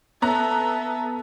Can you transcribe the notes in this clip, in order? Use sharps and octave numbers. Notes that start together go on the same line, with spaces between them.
B3 A4 E5 A#5 F#6